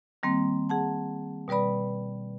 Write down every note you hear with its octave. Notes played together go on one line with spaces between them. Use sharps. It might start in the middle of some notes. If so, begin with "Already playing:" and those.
D#3 G3 A#3 C4
G#4 F#5 A5
B2 G3 B4 D5 B5